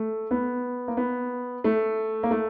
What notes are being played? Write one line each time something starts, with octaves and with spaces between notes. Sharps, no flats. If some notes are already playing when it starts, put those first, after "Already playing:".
Already playing: A3
B3
A#3
B3
A3
A#3
A3